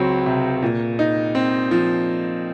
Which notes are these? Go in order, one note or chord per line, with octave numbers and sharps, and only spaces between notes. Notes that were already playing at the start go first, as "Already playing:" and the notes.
Already playing: C#2 F#3 C4
C3
A#2
D#4
C4
F3